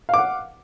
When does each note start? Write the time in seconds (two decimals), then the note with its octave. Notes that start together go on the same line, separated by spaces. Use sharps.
0.09 F5
0.14 D6
0.18 F#5